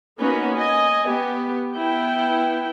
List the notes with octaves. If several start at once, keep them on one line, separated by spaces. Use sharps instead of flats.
A#3 B3 C#4 D#4 F#4
D#5 G#5
B3 G4
B3 E4 G5